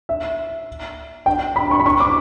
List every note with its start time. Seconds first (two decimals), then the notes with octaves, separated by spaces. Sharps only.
0.09 E5
1.26 G5
1.56 B5
1.71 C#6
1.80 B5
1.86 C#6
2.00 D6